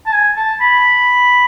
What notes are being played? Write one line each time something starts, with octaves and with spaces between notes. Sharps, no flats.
A5
G#5
A5
B5